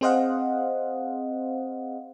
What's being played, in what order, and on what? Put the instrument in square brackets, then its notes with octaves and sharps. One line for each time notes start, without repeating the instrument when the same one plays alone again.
[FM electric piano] C4 G#4 C5 D#5 F5 F#5